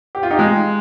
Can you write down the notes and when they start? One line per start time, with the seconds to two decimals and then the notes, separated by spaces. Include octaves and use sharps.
0.15 G4
0.23 F4
0.30 D#4 G4
0.39 G#3